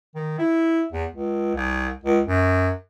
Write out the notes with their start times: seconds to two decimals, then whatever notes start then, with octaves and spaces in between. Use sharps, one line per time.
0.15 D#3
0.39 E4
0.93 E2
1.11 C#2
1.55 C2
2.04 C#2
2.26 F#2